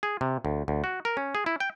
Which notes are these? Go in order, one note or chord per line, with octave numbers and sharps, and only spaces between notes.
G#4
C3
D2
D2
F#4
A#4
C#4
G#4
E4
G5